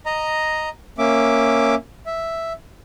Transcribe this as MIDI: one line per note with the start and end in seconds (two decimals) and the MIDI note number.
0.06 0.69 75
0.06 0.69 82
0.98 1.75 58
0.98 1.75 61
0.98 1.75 76
0.98 1.75 86
2.06 2.53 76